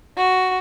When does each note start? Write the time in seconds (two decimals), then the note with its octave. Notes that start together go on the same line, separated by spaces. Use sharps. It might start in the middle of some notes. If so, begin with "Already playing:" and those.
0.17 F#4